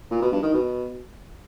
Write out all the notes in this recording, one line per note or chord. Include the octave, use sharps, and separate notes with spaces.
A#2
B2
G2
D#3
B2